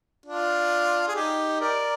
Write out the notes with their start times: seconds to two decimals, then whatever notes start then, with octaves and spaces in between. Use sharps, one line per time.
0.26 D4 F4
1.08 G#4
1.16 D#4 G4
1.61 A#4 D5